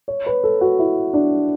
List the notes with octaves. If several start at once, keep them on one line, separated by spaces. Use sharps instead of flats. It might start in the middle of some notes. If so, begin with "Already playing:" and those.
C#5
B4
A4
F#4
E4
D4